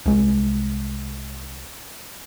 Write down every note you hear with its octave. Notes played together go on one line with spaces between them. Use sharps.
C2 G#3